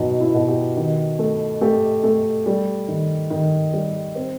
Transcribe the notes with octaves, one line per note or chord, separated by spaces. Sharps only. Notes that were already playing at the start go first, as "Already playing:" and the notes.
Already playing: B2 F#3 D#4
E4
B2
G4
D#3
A3
A3 G4
A3
G3
D#3
D#3
G3
C4